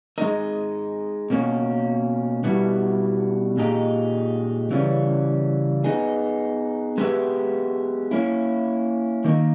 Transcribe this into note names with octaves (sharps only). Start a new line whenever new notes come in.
G#3 D#4 A#4 D#5
B2 A#3 C#4
B2 G3 B3 E4
A#2 G#3 D#4 G4
C#3 E3 G3 C#4
B3 D#4 G#4
G#3 B3 G4 B4 E5
A#3 C#4 E4
D#3 A#3 D#4 A#4